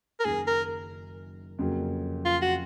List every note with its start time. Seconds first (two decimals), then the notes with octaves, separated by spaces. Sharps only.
0.20 A#4
0.25 F#1 F#2 D#3 G#4
0.47 A#4
1.59 F2 C#3 F#3 A#3
2.25 F4
2.42 F#4